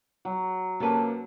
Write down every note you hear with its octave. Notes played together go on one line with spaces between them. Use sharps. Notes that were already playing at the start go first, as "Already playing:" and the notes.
F#3
C3 A#3 C#4 A4 B4